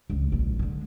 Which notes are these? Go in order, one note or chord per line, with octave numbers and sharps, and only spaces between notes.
C#2
A#1 A#2
D3 G#3